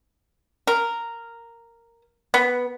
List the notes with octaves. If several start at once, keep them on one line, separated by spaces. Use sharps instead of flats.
A#4
B3